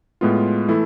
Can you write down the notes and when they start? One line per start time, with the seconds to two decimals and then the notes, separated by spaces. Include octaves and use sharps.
0.21 A2 G#3 B3 F4
0.69 E3 A3 E4 A4